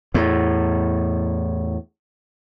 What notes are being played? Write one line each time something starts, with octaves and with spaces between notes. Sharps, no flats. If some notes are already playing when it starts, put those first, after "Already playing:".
E2 A2